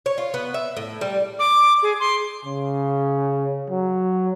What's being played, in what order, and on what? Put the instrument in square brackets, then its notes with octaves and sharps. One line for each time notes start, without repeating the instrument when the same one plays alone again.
[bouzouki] C#5
F4
B3
E5
A2
G3
[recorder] D6
G#4
C6
[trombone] C#3
F#3